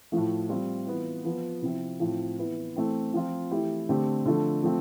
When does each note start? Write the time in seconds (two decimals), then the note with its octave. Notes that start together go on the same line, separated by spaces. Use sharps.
0.12 A2 F3 A3
0.49 G3 C4 F4
0.87 E3 B3 F4
1.25 F3 B3 F4
1.62 C3 F3 C4 E4
2.00 A2 F3 C4
2.38 E3 B3 E4
2.76 E3 A3 C4 E4
3.14 F3 C4 F4
3.51 E3 A3 E4 G4
3.89 D3 A3 C4 G4
4.26 D3 F3 A3
4.63 F3 A3 C4